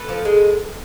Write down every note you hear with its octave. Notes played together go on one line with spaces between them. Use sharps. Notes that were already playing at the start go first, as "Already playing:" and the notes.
Already playing: A4 B4
F3
G#3